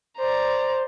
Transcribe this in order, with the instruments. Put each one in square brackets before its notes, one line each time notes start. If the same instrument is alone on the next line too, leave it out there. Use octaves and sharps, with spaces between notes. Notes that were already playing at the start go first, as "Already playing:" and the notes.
[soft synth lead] C5 [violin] D5 A#5